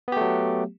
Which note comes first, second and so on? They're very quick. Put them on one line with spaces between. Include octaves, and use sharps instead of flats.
B3 G4 A3 F#3